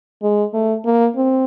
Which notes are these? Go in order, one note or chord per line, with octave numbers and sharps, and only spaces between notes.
G#3
A3
A#3
C4